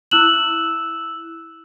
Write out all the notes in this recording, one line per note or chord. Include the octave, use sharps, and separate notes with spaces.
E4 E6 F#6 E7 F#7